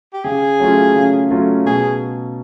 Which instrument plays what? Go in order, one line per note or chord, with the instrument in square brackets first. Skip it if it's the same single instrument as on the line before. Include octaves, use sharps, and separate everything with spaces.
[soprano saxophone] G4
[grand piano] C#3 [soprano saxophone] G#4
[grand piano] F#3 A3 C#4 F4
C#3
F#3 A3 C#4 F4
[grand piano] B2 [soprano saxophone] G#4